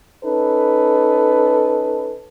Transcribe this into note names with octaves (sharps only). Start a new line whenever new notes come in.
C#4 D#4 A4 B4